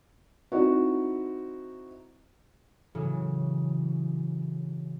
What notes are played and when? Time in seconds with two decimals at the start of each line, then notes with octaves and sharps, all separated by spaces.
0.52 C4 D#4 E4 F#4
2.95 A2 C#3 E3 F#3